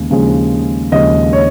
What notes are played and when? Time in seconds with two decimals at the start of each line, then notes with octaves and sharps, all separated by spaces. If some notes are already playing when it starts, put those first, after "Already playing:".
Already playing: D#2 C#3 G#3
0.10 D#2 C#3 F3 G#3
0.92 D#2 C#3 F3 G#3 D#5
1.33 C#5